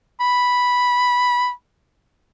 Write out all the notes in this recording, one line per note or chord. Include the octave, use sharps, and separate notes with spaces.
B5